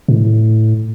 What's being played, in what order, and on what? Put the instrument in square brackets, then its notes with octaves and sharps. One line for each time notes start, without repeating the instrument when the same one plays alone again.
[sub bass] A2